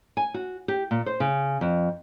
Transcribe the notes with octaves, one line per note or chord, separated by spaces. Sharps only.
G#5
F#4
G4
A#2
C5
C#3
F2